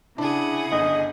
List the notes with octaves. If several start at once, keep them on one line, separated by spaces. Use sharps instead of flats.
C#3 D4 E4 G#4 F#5
G1 D#5